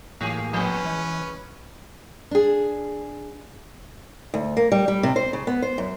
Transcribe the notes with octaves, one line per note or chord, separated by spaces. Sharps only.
A2 E3 A#3 G4 G#4
F3 B3 C#4 B4
E3 G#3
D4 G#4
D2
A#3
G3
G3
C3
C5
C#3
B3
C5
F#2